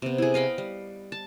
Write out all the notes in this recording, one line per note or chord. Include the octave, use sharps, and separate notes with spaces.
C3 B3
E4 G#4
D#5 F5 G5 B5
G3
A5